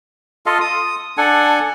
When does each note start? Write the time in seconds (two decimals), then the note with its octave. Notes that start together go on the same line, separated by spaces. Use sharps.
0.46 F4 A4 D#5 F5
0.61 D#6
1.17 D4 A4 F#5 G#5